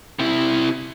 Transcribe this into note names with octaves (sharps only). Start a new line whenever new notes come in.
C3 E4